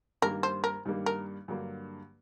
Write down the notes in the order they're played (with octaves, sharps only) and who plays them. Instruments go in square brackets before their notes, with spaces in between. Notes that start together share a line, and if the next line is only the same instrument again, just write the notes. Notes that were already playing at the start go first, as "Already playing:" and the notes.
[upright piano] G2 D#3 G3 A#3 [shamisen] A#4
[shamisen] C5
A#4
[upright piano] G2 D#3 G3 A#3
[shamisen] A#4
[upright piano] G2 D3 F#3 A#3